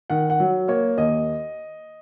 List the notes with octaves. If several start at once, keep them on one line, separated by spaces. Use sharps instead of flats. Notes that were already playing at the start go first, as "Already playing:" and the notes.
D#3 F#5
F#5
F#3
A#3 C#5
D#2 D#5